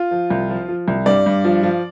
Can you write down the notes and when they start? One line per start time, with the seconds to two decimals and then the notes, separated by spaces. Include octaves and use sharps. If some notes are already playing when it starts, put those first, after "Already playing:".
Already playing: F4
0.11 F3
0.30 C2
0.50 F3
0.68 F3
0.88 C2
1.06 G2 D5
1.26 G2
1.44 F3
1.63 F3